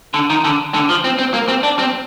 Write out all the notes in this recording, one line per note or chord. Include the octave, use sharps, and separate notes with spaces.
D3
D#3
D3
D3
F3
C4
C4
A#3
C4
D4
C4